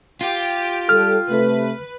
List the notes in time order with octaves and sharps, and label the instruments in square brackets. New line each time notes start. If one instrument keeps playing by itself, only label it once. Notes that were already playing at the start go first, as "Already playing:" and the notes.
[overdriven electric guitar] F4 [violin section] G4
[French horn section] G3 A4 [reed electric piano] F6
[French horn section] C3 A3 [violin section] B4